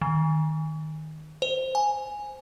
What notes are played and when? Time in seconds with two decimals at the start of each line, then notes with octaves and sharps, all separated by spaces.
0.01 D#3
1.42 C5
1.75 G#5